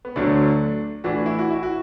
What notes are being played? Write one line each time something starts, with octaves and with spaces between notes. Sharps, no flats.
B3
D2 D3 F#3 A3 D4
A2 E3 D4 F#4
E4
F#4
E4
F#4